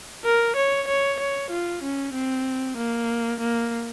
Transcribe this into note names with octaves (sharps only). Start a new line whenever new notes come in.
A#4
C#5
C#5
C#5
F4
C#4
C4
A#3
A#3